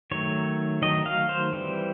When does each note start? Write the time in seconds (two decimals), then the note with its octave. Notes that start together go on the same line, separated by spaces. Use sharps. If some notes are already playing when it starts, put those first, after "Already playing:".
0.11 D#3 F#3 A3 C#5
0.82 D#3 F#3 A3 D#5
1.06 F5
1.29 C5
1.53 E3 G3 C4